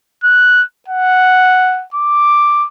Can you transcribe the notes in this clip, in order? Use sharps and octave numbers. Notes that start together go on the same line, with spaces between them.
F#6
F#5
D6